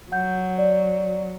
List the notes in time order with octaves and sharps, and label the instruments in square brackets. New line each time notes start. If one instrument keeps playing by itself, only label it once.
[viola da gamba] F#3 [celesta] F#5 G6
[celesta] D5